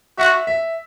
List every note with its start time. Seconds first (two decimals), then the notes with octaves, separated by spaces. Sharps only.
0.18 F#4 E5
0.47 E5